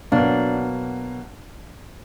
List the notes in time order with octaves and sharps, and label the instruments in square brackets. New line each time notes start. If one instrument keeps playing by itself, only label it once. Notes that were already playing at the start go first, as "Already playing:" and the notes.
[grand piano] B2 F#3 A#3 [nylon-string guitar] D4